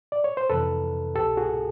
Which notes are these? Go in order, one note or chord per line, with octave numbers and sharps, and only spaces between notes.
D5
C#5
C5
F2 C3 E3 A4 B4
C2 B2 G4 A4
F#4 G#4